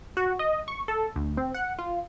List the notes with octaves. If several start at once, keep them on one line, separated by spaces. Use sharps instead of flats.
F#4
D#5
C#6
A4
D2
C4
F#5
F4